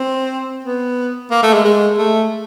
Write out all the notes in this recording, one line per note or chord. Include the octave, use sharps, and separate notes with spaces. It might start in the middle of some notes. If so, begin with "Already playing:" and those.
Already playing: C4
B3
A#3
A3
G#3
G#3
A3